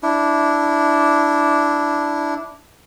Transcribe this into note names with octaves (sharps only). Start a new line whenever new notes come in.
D4 E4